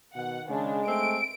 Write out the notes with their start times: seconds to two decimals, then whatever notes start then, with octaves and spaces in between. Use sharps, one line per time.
0.15 B2 D#3 F#5
0.50 C#3 G#3 D4
0.87 A3 C4 D7